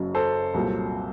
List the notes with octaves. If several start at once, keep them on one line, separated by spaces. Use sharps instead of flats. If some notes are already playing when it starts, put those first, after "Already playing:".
Already playing: F#1 F#2 C#3 F#3
A4 C5
C2 A#2 F#3 A#3